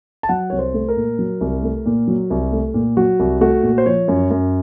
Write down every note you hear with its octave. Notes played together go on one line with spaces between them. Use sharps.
A5
F#3 F#5
C2 C#5
C5
A3
A#4
A#2
F#3
C2
A3
A#2
F#3
C2
A3
A#2
F#3 F#4
C2
A3 F#4
A#2
C5
F3 C#5
F#2
F#2